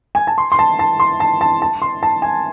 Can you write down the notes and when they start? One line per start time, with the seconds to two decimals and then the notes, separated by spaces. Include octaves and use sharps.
0.15 G#5
0.27 A5
0.38 C6
0.52 C6
0.59 A5
0.79 A5
1.00 C6
1.20 A5
1.41 A5
1.62 A5
1.82 C6
2.03 A5
2.22 G#5